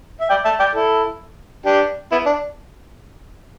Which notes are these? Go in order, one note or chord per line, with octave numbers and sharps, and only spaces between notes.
E5
D5 G5
E5 A5
D5 G5
E4 A4
D4 G4
B3 E4
D4